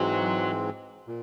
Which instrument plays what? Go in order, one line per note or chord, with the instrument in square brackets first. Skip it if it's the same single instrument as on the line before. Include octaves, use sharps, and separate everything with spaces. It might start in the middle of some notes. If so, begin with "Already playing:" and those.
Already playing: [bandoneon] G#2 E3 G#3 C4 [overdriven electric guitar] F#3
[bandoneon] A#2